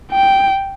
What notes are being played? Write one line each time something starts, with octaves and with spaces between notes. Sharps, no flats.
G5